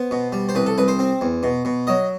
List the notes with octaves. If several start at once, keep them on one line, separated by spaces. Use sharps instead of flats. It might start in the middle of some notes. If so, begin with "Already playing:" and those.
Already playing: B3 C5
B2
G3
C5
C2 B4
A4
C2 B4
C5
C4
E2
B2
B2
F#3 D#5